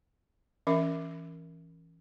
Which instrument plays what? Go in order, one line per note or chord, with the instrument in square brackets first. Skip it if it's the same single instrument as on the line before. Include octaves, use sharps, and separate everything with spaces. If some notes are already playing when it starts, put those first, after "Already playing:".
[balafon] E3 C#4 A#4 E5